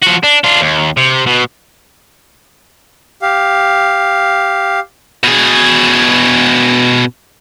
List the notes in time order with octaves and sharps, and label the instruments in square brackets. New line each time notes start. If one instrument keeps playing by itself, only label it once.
[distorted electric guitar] F3 F#4
D4
D4 F4
D#2
C3
B2
[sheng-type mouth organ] G4 F5
[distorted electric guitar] B2 G#4